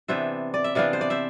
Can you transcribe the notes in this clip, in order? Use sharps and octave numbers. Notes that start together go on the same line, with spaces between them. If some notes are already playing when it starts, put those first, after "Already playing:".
C3 E3 B3 D4 C5 E5
D5
E5
C3 E3 B3 D4 D5 F5
C5
D5
C5 E5